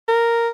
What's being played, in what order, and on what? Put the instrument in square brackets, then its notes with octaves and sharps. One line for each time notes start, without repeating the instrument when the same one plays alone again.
[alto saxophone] A#4